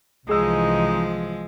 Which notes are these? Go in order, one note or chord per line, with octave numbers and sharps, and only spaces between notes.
C2 E3 F3 G#3 D#4 G#4 E6